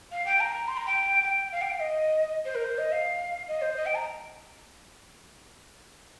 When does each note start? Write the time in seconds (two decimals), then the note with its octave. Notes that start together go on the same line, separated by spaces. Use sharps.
0.11 F5
0.26 G5
0.40 A#5
0.68 C6
0.77 A#5
0.86 G5
1.23 G5
1.52 F5
1.61 G5
1.70 F5
1.80 D#5
2.45 C5
2.55 A#4
2.64 C5
2.78 D#5
2.92 F5
3.48 D#5
3.61 C5
3.76 D#5
3.86 G5
3.95 A#5